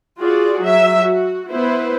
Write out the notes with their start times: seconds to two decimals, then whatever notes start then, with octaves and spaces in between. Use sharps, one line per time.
0.20 F4 F#4 G#4 D5
0.61 F#3 E5
1.03 F#4
1.50 B3 E4 B4 C5